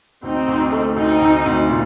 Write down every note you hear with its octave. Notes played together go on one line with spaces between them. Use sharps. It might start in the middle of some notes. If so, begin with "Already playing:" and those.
D2 C4 D#4
D2
A3
D2 C4 D#4
D2
D2
A#2